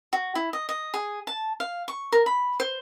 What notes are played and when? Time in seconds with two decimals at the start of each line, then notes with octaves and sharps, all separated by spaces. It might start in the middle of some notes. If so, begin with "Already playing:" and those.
0.13 F#4
0.35 E4
0.53 D#5
0.69 D#5
0.94 G#4
1.27 A5
1.60 F5
1.88 C#6
2.12 A#4
2.26 B5
2.60 C5